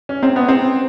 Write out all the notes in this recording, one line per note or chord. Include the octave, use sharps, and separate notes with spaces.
C#4
C4
B3
C4